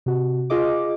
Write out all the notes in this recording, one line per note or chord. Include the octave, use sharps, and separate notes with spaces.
C3 F#4
F4 G#4 D#5 D6